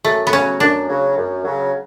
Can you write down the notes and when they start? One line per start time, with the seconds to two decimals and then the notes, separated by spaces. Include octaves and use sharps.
0.04 F#2 A3
0.27 B3
0.33 C#3 F#3 C#4
0.60 F#2 D4
0.89 C#3 F#3
1.17 F#2
1.45 C#3 F#3